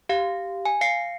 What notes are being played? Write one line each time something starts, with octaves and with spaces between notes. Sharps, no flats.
G4 F5
G#5
F5 C7 C#7